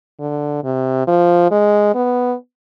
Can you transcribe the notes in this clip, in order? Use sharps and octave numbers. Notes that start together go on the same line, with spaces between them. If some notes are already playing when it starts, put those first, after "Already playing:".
D3
C3
F3
G#3
B3